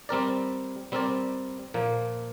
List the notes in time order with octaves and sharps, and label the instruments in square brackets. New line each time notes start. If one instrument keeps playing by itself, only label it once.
[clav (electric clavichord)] G3 C4 A#4 D5
G3 C4 A#4 D5
A#2 F3 A#3